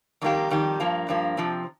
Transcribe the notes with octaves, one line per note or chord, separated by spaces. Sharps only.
F2 D#3 G3 A#3 G4
F2 D#3 G3 G4
G2 F3 A#3
G2 F3 A#3
C3 F3 C4